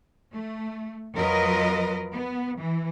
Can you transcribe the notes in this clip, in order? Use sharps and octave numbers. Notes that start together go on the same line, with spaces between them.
A3
F2 F#3 F4 A#4 B4 D#5
B3
E3